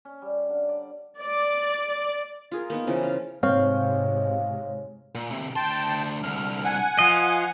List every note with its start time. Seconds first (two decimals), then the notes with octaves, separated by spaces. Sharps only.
0.05 C#4
0.22 G3
0.49 D3
0.69 D5
1.21 D5
2.52 F4 G#4 A#4
2.70 A#3 B3 D#4
2.87 C#3 E3 F3 A#3
3.03 F4
3.43 G#2 C3 G#3 C4 C#5 F5
5.15 A#2
5.30 A2 C3
5.56 D2 G5 A5 C6
6.24 C2 D3 F6
6.65 F#5 G#5
6.99 F3 D#5 F5